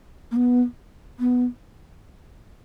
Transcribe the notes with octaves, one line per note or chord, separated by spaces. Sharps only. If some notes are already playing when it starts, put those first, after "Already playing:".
A#3
B3
B3